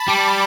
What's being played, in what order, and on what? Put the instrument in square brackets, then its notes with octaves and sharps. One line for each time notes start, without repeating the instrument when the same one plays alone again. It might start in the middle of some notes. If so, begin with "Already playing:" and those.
Already playing: [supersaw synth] A5 B5
[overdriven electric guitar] G3 [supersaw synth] D6